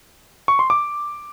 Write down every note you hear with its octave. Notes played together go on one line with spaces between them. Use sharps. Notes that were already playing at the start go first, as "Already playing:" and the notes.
C#6
C6
D6